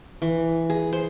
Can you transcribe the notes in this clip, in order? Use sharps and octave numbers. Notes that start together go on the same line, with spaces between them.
E3
G#4
C5